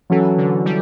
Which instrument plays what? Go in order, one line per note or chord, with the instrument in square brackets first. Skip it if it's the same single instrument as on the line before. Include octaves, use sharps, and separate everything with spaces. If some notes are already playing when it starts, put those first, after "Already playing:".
[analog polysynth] E3 [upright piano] F#3 C#4 F#4 A4
[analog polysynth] D3
G3